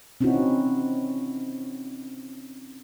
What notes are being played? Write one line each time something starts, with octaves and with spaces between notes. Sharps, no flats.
C4 C#4 D#4 E4 F#4